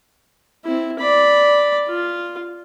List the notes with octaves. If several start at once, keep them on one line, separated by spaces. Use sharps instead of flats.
C4 E4
D5 B5
F4